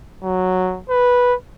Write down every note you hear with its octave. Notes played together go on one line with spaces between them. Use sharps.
F#3
B4